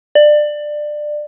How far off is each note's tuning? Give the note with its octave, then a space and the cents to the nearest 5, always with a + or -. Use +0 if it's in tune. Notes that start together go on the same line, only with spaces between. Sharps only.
D5 +20